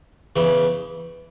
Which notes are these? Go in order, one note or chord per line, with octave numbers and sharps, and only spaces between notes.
E2 C#3 E3